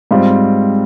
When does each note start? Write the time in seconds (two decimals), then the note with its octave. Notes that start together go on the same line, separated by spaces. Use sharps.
0.11 G#2 G3 C4 F4